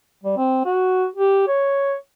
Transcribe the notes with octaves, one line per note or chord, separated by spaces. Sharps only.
G3
C4
F#4
G4
C#5